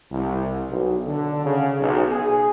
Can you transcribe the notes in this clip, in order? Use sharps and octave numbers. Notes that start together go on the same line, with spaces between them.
C2
B1
D3
C#3
B1
G#4